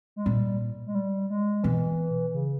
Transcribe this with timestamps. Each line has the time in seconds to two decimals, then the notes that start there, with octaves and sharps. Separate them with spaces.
0.16 G#3
0.25 A#2 G3
0.86 G#3
0.95 G3
1.30 G#3
1.64 B2 E3
2.34 C#3